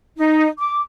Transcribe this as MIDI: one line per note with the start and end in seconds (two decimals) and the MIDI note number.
0.17 0.47 63
0.58 0.81 86